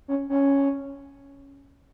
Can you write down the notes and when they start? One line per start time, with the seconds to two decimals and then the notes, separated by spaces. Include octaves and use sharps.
0.08 C#4
0.29 C#4